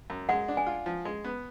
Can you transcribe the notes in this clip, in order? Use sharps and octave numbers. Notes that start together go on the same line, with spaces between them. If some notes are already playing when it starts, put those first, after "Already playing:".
F#2
G#3 F#5
D4
G#5
F4
F3
G#3
B3